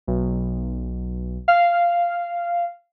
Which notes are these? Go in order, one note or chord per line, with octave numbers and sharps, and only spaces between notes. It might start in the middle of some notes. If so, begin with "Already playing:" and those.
B1
F5